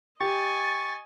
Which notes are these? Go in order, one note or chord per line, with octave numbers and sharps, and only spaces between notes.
G4 D#5 G#5 C#6 A6